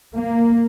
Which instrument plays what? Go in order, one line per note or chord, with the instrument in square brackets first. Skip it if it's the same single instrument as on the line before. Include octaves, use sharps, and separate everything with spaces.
[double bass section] A#3